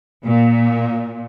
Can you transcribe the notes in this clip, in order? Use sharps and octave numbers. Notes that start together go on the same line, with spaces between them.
A#2